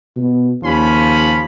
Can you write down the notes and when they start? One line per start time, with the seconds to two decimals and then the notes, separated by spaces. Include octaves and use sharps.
0.17 B2
0.62 D#2 F3 C#4 B5